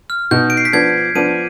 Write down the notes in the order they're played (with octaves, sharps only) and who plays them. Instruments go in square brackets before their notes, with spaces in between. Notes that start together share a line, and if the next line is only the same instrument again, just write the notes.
[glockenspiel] F6
[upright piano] B2 B3 D#4 [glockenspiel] G6
[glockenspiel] D7
C7
B6
[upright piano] F3 B3 D4 [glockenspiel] G#6
[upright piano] F3 B3 D4 [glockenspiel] D#7